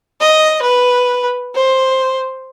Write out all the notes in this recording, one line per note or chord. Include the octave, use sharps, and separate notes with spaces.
D#5
B4
C5